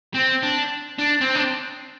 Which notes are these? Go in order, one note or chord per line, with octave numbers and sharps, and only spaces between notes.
C4
D4
D4
C4
D4